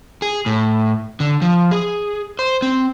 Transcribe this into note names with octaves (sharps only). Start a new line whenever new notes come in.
G#4
A2
D3
F3
G#4
C5
C4